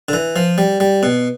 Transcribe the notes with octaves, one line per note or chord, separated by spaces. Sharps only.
D3
E3
F3
G3
G3
B2